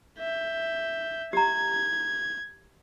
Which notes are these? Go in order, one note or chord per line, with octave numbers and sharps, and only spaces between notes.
E5 G6
G4 A#5 G#6